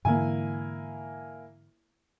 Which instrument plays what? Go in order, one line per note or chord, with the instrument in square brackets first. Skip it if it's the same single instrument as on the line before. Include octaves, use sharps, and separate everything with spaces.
[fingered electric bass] G#2 D3 E3 [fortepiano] A#3 E4 G#5